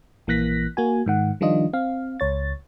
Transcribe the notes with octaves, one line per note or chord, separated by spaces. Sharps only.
A#1 E3 A#3 F#6 A#6 B6
A#3 F#4 G#5
G#2 D#3 F#5
D#3 F3 G3 D4 F4 D#5
C4 F5
C#2 C#5 A6